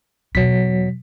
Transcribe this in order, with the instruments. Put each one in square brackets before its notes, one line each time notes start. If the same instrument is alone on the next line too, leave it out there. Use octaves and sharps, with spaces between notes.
[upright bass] E2 B2 [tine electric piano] F#3 B6